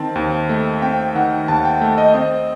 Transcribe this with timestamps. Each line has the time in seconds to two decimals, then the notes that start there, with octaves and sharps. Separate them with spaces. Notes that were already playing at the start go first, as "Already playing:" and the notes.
Already playing: D#3 C4 A5
0.15 D#2
0.49 A3
0.82 C4 G5
1.15 D#3 F#5
1.48 D#2 A5
1.65 G5
1.81 A3
1.98 D#5
2.14 C4 D#5